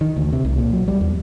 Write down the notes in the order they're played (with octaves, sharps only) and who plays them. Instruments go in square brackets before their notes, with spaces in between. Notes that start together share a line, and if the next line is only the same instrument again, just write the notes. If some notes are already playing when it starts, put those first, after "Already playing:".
[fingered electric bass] D#3
D2
C3
C2
A#2
F#3
G3
E2